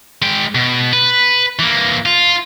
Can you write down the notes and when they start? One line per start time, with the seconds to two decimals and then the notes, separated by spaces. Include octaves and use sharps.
0.22 G#3 G5
0.55 B2
0.93 B4
1.59 E3 A#3
2.06 F4